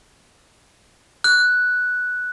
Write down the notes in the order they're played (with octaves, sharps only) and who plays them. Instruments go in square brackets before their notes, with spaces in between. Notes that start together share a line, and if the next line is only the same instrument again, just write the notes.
[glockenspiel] F#6